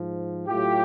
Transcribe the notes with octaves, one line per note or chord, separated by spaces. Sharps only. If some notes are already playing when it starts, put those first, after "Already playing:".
Already playing: G#2 F3
A2 F#3 F4 G4